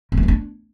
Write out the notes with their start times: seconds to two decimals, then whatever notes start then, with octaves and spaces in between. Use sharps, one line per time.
0.12 A#3
0.17 A3
0.23 B3
0.28 D4